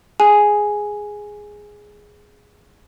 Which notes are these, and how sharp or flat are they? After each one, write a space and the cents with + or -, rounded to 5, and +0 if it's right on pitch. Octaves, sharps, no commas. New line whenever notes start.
G#4 +0 G#5 +0